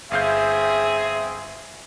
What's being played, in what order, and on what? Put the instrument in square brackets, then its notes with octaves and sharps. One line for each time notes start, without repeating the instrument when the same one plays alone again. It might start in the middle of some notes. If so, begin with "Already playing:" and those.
[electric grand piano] G1 F5 G6 [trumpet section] C4 G#4 [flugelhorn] E5